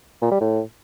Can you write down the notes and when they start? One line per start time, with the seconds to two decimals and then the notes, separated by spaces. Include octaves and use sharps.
0.22 A#2
0.31 G3
0.41 A2